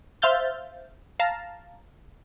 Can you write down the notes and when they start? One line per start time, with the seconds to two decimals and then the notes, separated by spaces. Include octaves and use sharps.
0.22 C5 E5 F5 F6 G6 A6
1.20 F5 A5 A#5